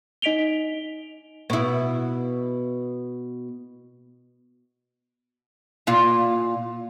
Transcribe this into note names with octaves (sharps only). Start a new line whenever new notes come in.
D#4 D#5 B6 D7 F7 G7
B2 E4
A#2 F4